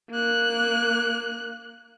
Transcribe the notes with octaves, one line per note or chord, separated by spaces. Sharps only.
A#3 F#6